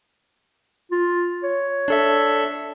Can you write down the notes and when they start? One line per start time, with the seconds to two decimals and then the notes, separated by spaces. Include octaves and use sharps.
0.91 F4
1.43 C#5
1.88 D4 A4 E5